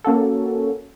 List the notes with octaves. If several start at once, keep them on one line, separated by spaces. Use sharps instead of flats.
A#3 C#4 F#4 A4